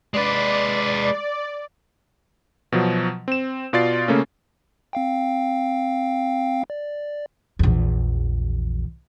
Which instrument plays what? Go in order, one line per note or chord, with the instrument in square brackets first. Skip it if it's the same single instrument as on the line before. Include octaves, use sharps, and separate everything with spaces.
[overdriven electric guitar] G#3 B4 [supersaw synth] D5
[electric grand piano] B2 F3 F#3
C4 E7
B2 F4 D5 A6 C7
C#3 A3 A#3 C#4
[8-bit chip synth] C4 F5 G5
D5
[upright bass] A#1 E2